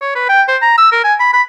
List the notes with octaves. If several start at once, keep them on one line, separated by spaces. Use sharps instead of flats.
C#5
B4
G5
C5
A#5
E6
A#4
G#5
B5
B5